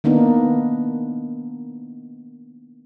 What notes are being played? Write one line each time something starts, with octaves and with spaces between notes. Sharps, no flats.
D#3 A#3 B3 D4 D#4